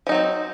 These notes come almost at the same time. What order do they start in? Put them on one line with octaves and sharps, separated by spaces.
F3 D#4 F#3 C4